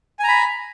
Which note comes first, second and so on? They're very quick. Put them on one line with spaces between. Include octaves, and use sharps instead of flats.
G#5 A#5 B5